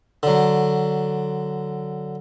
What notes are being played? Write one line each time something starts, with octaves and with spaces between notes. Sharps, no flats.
D3 F#3